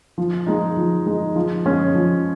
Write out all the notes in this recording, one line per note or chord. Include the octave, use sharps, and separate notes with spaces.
F3
G#3 D#4
F3
G#3 D#4
F3
G#3 C#4 G#4 C#5
F3